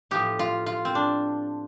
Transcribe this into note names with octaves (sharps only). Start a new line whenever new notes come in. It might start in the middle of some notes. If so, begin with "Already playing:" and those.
A2 F3 B3 G4
F4
F4
C4
D4